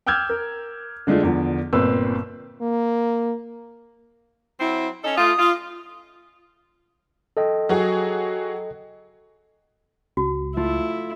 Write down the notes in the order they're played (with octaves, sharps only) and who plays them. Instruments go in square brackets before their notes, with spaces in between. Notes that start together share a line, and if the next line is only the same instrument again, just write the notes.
[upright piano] G5 D6 E6 F6 G6 G#6
A#4
D3 G#3 A3 D4 F4
E2 D3 F3
G1 A#2 C4 B4 E6
[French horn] A#3
[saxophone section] F#3 C4 E4
C#4 A4 D#5
[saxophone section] A3 F4 [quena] D#6
[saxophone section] F4
[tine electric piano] A4 D#5 G5
[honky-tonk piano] F#3 F#4 G#4
[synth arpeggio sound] C#2 [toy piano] F#4
[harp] A3 F4 [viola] E4